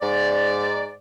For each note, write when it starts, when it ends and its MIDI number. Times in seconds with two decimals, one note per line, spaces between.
0.01 0.92 44
0.01 0.92 74